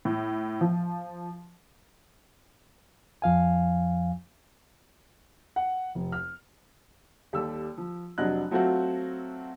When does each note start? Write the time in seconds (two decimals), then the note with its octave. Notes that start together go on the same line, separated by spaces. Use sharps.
0.05 A2
0.61 F3
3.22 F2 F3 F5 G#5
5.56 F#5
5.95 F1
6.12 F6
7.33 D#2 G3 A4 E6
7.78 F3
8.18 F1 F#3 D4 D#5 F#6
8.51 F#3 A3 C4 F4 F#4